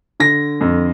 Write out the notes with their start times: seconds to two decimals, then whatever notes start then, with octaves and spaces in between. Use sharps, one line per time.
0.20 D3 A#6
0.61 F2